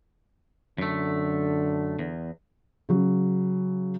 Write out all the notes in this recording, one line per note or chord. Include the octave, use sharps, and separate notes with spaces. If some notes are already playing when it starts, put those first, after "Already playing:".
F#2 D3 A3
E2
C#3 F#3